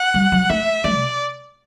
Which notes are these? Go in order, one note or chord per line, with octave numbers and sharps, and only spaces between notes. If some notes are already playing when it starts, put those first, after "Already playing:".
Already playing: F#5
G3
F#3
A3 E5
A3 D5
C3